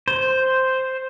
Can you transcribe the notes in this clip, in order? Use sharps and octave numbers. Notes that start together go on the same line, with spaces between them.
C5